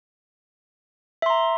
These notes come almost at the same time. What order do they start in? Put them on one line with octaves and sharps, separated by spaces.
E5 C6 A#5